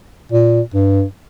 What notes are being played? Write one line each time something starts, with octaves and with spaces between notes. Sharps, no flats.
A#2
G2